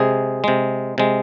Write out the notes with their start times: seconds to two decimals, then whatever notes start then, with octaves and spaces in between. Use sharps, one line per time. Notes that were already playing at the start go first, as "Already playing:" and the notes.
Already playing: C3 G#3 G#4
0.44 C3 G#3
0.98 C3 G#3